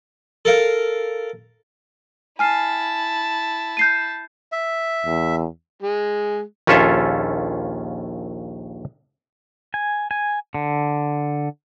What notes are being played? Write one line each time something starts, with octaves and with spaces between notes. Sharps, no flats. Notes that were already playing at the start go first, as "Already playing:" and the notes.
A4 A#4 F5
E4 G#5 A5 F6 C7
G6 C7 D#7
E5
E2
G#3
A#1 D#2 C#4 F4 A4 E5
G#5
G#5
D3